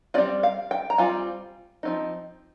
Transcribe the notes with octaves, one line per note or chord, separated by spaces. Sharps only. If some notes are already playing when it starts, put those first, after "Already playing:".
G3 C4 F4 D5
F5
G5
A#5
G3 C4 F4 G#5
F3 C4 D#4